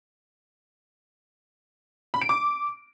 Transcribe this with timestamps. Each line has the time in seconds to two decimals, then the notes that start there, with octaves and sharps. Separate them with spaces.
2.14 B5
2.22 D7
2.29 D6